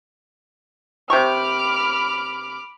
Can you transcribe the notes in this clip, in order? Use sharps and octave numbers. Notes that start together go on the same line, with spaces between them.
C3 G5 B5 C#6 D6 F6